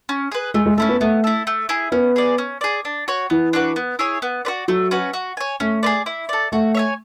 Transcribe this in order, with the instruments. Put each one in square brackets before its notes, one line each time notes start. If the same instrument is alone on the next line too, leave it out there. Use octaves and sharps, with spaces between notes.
[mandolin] C#4
G#4 B4
[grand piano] G#3 [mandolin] A3
[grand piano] G#3
[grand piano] A3 [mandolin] C#4 E4 A4
[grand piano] B3
[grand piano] A3 [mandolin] B3
[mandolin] E4 A4
A3
E4 G#4
[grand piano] B3 [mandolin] C#4
[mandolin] G#4 D5
C#4
G#4 D5
D4
F#4 C#5
[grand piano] E3 [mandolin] B3
[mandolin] D4 F#4 B4
B3
E4 G#4 C#5
B3
F#4 B4 D5
[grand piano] F#3 [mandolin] A3
[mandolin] C#4 F#4 B4
F#4
C#5 G#5
[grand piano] A3 [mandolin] C#4
[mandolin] G#4 B4 D5
E4
A4 D5
[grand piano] A3 [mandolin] F#4
[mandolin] C#5 E5 G#5